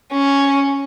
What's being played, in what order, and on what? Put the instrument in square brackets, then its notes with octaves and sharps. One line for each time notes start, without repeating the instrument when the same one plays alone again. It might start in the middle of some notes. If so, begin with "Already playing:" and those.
[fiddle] C#4